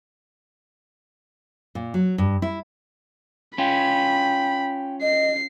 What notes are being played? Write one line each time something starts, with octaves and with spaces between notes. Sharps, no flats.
A#2
F#3
G2
E4
C#4 F4 G5 B5
D#5 C7